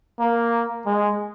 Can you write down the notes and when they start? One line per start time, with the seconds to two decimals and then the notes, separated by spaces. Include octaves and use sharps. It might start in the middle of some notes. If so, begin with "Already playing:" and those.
0.19 A#3
0.86 G#3